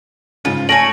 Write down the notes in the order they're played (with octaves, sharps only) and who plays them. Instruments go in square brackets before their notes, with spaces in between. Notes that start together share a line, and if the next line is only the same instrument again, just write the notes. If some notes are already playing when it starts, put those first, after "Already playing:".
[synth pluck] G#2 C#3 C#4 [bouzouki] F4
[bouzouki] A3 C#5 G#5 [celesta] A#6 D7 F#7